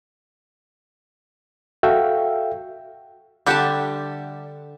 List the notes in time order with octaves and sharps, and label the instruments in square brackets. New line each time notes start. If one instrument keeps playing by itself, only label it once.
[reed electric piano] F#4 A4 E5 F5 G5
[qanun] D3 E5 A5 [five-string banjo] G3 G4 F#5